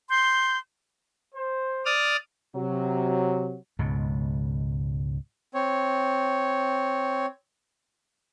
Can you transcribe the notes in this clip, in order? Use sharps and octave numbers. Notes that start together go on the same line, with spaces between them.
C6 G6
C5
D5 D#6 F6
C3 F#3
C#2 G#2 B2
C4 C#5